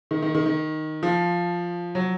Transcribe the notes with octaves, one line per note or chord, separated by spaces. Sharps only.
D#3
D#3
D#3
D#3
F3
F#3